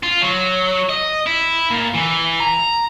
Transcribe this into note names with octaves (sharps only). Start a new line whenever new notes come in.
F4
F#3
D#5
E4
A#2
E3
A#5